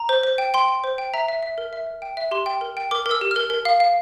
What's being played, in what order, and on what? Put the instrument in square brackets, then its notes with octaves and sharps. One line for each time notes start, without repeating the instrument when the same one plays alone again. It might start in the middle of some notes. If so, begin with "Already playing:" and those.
Already playing: [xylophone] A#5
C5
C5
G5
G5 C6
G5
C5
G5
E5 A#5
E5
E5
A#4
E5
A#4
G5
E5
G4 C6
G5
A#4
G5
A#4 D6
A#4
E6
G4
F6
A#4
A#4
F5
F5